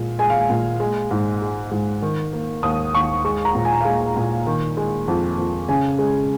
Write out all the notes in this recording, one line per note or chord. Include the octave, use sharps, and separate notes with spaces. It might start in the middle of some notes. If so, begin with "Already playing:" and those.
Already playing: A#2 G#3
G#3 G#5
F5
G#5
A#2
G#3
G#2
G#3
G#2
D#3
A#3
D#2 D#6
D#2 C#6
G#3 C#6
A#5
A#2
G#5
F5
G#3 G#5
A#2
D#3
G#3
F2
F2
C#3 G#5
G#3